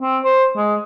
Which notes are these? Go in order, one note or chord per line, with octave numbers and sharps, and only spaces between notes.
C4
C5
G#3